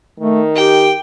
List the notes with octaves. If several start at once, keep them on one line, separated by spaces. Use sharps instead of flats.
D#3 A3
G4 G5